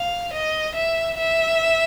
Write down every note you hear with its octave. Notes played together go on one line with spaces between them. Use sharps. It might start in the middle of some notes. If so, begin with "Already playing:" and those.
Already playing: F5
D#5
E5
E5